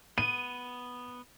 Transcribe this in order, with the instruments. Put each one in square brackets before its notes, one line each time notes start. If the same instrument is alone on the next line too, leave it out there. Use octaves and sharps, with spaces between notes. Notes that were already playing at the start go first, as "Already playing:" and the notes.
[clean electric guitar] B3 [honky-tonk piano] D#7